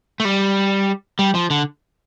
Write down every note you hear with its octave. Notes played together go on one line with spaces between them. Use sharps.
A3
G3
G3
F3
D3